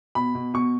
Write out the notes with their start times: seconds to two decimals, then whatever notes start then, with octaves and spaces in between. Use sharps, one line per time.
0.15 B2 B5
0.35 B2
0.54 B2 C#6